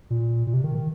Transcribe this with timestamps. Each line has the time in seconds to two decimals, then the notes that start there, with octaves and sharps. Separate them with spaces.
0.10 A#2
0.47 A#2
0.53 C3
0.64 D#3
0.75 D#3